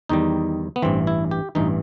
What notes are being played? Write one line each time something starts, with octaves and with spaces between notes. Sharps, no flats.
E2 D#3 G3 D#4
B3
A1 G2 E3 C4
E4
G4
A1 G2 E3 D#4